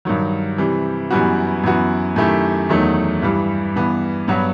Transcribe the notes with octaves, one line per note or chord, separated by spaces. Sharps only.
G2 D#3 F#3
C3 E3 G3
F#2 E3 G3 B3 F#4
F#2 E3 B3 F#4
F#2 D#3 A3 E4 G4
E2 D#3 F#3 A3 D#4
G2 E3 G3
G2 E3 B3
G2 F#3 B3 F#4